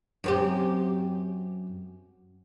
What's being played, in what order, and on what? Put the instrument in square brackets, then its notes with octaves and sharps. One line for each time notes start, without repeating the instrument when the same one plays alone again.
[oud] F#2 C4 G4